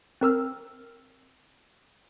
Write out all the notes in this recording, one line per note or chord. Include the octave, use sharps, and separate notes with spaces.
C4 A#4 E6 F6